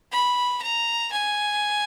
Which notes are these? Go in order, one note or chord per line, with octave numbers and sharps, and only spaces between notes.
B5
A#5
G#5